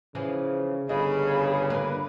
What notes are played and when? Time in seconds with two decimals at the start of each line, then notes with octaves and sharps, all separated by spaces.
0.15 C#3 E3 F3 G#4
0.89 G1 C#3 G#4 D#5 B5
1.70 A#3 D4 B4